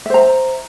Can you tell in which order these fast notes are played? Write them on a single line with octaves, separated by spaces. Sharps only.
E5 C5 A#5